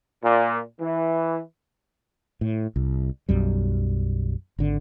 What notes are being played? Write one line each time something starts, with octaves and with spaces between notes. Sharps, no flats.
A#2
E3
A2
C2
B1 F#2 G3
G#1 D3